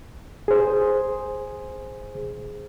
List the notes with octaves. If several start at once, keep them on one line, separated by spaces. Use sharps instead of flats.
G#4 C5